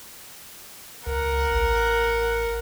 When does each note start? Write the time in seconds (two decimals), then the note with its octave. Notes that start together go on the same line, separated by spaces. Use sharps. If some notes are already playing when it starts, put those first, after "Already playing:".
1.07 C#2 A#4 F#5
1.52 A1